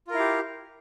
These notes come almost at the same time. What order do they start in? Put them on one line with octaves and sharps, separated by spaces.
F4 A#4 E4 F5 G4